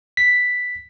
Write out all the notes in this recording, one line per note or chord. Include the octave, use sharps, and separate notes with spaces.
B6